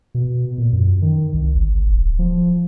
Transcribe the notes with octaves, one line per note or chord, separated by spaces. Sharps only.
B2
A#2
F#2
D#3
C2
G1
D1
F3